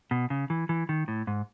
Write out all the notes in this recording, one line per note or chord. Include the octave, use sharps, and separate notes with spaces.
B2
C#3
E3
E3
D#3
A2
G#2